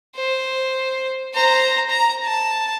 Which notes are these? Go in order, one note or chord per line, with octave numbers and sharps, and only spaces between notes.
C5
C5 A#5
A#5
A5